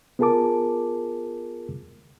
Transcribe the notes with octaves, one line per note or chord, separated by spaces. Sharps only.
B3 F4 G#4 A#4 A5 D6